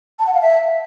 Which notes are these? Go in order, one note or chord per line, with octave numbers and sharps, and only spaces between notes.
A5
F#5
F5
E5